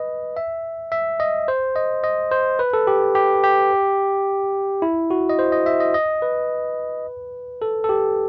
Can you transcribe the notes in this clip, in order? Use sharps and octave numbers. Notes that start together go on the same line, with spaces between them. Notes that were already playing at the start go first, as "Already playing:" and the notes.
Already playing: B4 D#5
E5
E5
D#5
C5
D#5
D#5
C5
B4
A4
G4
G4
G4
E4
F#4
D#5
C5
D#5
E5
D#5
D#5
B4
A4
A4
G4